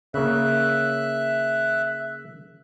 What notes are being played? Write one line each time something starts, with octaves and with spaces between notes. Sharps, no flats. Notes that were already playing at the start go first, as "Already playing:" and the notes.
C#3 A#3 E5 F#6